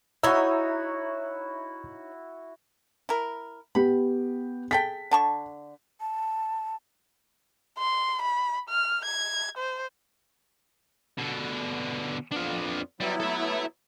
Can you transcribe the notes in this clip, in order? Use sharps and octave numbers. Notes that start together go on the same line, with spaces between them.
D#4 E4 F#4 C#5 E5 A#5 E6
E4 A#4
B3 G4 B5
G#4 A4 G5 B6
D3 A5 C#6
A5
C6
B5
F6
G#6
C5
B2 D3
F2 B3 D4 F4
F#3 G3 B3 E4
A4 E5